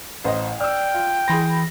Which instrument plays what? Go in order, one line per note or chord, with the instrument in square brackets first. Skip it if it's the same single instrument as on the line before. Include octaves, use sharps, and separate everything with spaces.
[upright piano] A1 C5 D#5
[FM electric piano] D5 [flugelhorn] G5 [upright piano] E6 F6
[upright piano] F4
[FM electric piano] E3 A#6 [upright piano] G#4 B5 C6